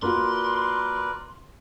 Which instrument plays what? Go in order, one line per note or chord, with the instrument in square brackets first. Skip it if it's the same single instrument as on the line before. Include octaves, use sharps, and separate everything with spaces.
[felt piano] A#3 F4 F#4 [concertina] A#4 B4 D5 [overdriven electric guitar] C6